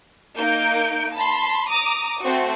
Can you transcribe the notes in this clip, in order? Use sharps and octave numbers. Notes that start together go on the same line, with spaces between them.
A#3 D#4 G6 D7
A5 B5 C6
A#5 D6 D#6
A3 C4 F#4